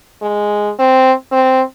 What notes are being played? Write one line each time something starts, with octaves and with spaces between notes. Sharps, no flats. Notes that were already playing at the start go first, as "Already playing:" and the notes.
G#3
C4
C4